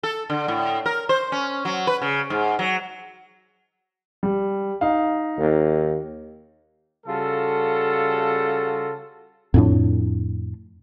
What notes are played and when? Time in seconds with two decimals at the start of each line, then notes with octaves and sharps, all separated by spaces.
0.03 A4
0.30 D3
0.48 A2
0.86 A#4
1.09 C5
1.32 C#4
1.65 F#3
1.87 B4
2.01 C#3
2.30 G#2
2.59 F#3
4.23 G3
4.81 D#4 F5
5.39 D#2
7.06 C#3 G3 F4 F#4 A4
9.54 F2 A2 D4